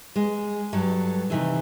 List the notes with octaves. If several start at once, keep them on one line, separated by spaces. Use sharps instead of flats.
G#3
G2 F#3 A4
C3 D#3 E3